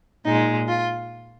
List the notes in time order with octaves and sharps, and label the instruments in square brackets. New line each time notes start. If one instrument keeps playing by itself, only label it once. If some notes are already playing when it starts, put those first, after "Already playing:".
[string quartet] A#2 G#3 D#4
F4